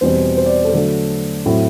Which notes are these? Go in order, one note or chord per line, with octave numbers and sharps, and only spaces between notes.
E2 B2 G3 C4 C5
C5
D5
A4
D3 F#3 A3
A2 F#3 C4 E4